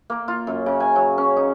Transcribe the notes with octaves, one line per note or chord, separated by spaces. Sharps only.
A#3
F4
F#2
C#3
G#5
F#3
C#4
D#4